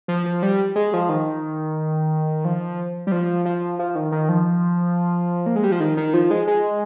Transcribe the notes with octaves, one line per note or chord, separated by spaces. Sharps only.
F3
F3
G3
G#3
F3
D#3
F3
G3
F3
F3
F3
D#3
D#3
F3
A#3
G#3
G3
F3
D#3
D#3
F3
G#3
G#3